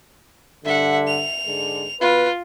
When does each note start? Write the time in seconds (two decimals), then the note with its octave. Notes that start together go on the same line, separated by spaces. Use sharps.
0.65 G2 D3 E5 F#5
1.07 F7
1.46 G#2 D3 G#3
2.01 B2 F4 B4